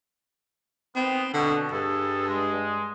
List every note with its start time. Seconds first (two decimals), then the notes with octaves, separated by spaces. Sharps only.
0.96 D#3 G#3 B3 C4
1.34 B2 D3
1.72 G2 G#4 A4
2.27 G#3